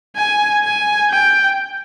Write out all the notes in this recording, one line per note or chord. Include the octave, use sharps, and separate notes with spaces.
G#5
G#5
G5